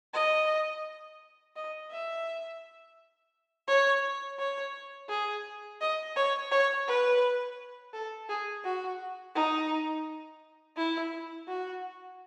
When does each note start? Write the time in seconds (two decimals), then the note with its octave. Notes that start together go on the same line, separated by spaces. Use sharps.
0.13 D#5
1.56 D#5
1.91 E5
3.67 C#5
4.39 C#5
5.09 G#4
5.81 D#5
6.16 C#5
6.51 C#5
6.88 B4
7.93 A4
8.29 G#4
8.65 F#4
9.35 D#4
10.77 E4
11.48 F#4